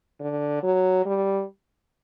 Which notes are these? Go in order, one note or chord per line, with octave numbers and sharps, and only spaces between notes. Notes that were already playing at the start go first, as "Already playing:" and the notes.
D3
F#3
G3